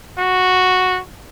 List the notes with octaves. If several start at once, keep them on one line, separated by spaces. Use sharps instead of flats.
F#4